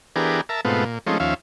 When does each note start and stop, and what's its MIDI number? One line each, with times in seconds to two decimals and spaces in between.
0.16 0.41 52
0.16 0.41 59
0.16 0.41 62
0.16 0.41 67
0.16 0.41 68
0.16 0.41 70
0.49 0.61 70
0.49 0.61 76
0.49 0.61 81
0.65 0.84 44
0.65 0.84 47
0.65 0.84 57
0.65 0.84 59
0.65 0.84 60
0.65 0.84 65
0.85 0.98 46
1.07 1.18 53
1.07 1.18 56
1.07 1.18 57
1.07 1.18 60
1.07 1.18 61
1.07 1.18 63
1.20 1.34 39
1.20 1.34 53
1.20 1.34 61
1.20 1.34 76
1.20 1.34 77